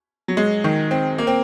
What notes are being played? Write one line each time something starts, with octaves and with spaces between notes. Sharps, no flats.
F#3
G#3
D#3
C4
A#3
C4